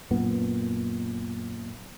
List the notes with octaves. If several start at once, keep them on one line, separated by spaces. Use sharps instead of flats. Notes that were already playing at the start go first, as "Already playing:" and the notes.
F#2 A#2 B3